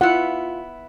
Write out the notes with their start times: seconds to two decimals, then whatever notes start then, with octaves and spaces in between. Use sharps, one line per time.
0.01 B3 E4 F4 F#5